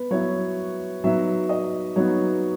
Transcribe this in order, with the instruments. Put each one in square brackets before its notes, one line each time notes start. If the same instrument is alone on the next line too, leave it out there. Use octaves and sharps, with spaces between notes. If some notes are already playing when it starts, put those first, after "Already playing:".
Already playing: [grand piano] B3 B4
F#3 B3 E4 C#5
F#3 B3 D#4 E5
D#5
F#3 B3 D#4 C#5